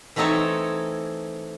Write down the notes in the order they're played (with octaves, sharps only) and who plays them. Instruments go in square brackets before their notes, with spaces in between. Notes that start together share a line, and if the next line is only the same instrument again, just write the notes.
[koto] E3 A3 C4 D#4 A4 C#5